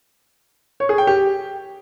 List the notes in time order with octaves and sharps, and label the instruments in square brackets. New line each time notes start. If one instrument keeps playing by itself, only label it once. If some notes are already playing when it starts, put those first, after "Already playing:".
[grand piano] C#5
G#4
G5
G4